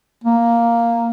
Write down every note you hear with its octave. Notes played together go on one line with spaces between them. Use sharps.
A#3